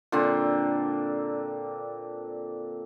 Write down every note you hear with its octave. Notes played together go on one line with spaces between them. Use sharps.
A#2 D3 C4